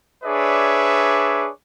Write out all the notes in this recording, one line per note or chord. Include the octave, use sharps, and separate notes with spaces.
D4 G#4 B4 C#5 D5 E5